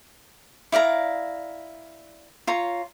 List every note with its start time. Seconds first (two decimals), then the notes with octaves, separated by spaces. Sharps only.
0.72 E4 D5 F5 A#5
2.47 F4 C#5 A#5